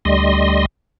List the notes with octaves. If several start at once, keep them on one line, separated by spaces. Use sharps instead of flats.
D2 G3 D#5 C6